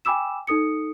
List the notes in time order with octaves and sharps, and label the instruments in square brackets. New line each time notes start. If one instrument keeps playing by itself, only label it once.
[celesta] G5 G#5 B5 D6 E6 E7
D#4 A4 D#6 C#7